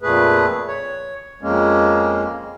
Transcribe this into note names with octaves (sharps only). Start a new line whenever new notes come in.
F2 A#2 A3 G#4 B4
C#5
F2 G#3 A#3 C#4